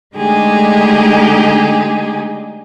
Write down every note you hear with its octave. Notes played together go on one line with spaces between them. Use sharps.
D3 G#3 A3 D#4 G4 G#4